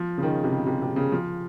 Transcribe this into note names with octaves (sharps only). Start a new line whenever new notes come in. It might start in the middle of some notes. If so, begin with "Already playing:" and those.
Already playing: F3
C#3
D#3
C3
C#3
C3
C3
C#3
F3